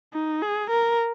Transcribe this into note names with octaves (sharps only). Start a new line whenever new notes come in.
D#4
G#4
A#4